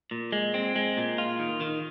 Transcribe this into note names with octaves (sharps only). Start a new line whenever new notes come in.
A#2
G#3
C4
G#3
A#2
F4
D#3
D#3